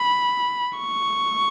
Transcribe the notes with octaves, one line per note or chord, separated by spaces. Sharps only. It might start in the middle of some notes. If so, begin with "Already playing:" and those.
Already playing: B5
C#6